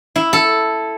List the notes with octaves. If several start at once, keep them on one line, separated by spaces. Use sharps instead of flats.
E4
A4